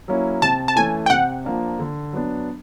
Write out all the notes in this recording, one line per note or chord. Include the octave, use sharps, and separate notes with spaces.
F#3 A#3 C#4 E4
C3 A5
A5
E3 A3 C#4 G#5
G5
C3 F#5
F3 A#3 D4
D3
F#3 B3 D4